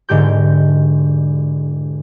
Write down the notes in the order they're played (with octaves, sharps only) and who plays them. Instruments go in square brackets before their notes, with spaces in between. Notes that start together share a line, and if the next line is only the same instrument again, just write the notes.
[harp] E1 G#2 D3 G4 G6